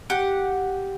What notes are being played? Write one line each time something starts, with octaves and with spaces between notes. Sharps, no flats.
G4 F#5